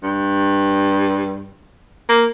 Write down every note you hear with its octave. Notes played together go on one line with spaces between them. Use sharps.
G2
A#3